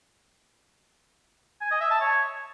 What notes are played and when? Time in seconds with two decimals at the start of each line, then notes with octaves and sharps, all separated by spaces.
1.61 G#5
1.71 D#5
1.81 E5
1.91 A5
2.00 C#5